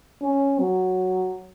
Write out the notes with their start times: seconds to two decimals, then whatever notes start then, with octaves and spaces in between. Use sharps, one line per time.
0.22 C#4
0.59 F#3